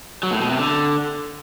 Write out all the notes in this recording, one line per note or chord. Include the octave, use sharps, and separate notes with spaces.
F#3
A2
B2
C3
D3